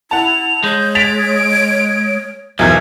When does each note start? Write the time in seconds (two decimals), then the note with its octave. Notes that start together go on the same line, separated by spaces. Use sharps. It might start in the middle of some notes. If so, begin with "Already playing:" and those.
0.11 E4 F#5 A5 F7
0.64 G#3 C#5 G6
0.95 A6 B6 D7 F7
2.59 B1 E2 F3 A#4 G#6